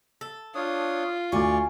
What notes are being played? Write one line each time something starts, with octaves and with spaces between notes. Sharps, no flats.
A4
D4 F4 C#5 D#6
D2 D5 G#5 C#6 D6